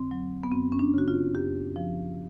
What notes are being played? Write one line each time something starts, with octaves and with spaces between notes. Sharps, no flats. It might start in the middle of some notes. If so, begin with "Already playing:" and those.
Already playing: F2 D3 C4
F#3
B3
F#2 C4
C#4
D4
C#3 F#4
F4
F#2 G4
F3